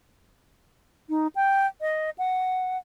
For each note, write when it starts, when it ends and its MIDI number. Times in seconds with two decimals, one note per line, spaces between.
1.09 1.27 63
1.35 1.67 79
1.81 2.10 75
2.18 2.78 78